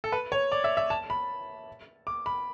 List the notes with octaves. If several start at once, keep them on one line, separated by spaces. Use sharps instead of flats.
A4
B4
C#5
D5
E5
E5
A5
B5
D6
B5